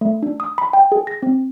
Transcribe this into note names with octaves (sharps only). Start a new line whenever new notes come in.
A3
D4
D#6
B5
G5
G#4
A#6
C4